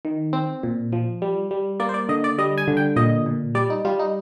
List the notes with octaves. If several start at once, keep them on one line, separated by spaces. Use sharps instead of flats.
D#3
C4
A#2
F3
G3
G3
A#3 D5
C5
D5
D3 D#5
D5
G3 D#5
G#5
D3
G5
A#2 D#5
A#2
G3 D5
D#4
G3 F4
D#4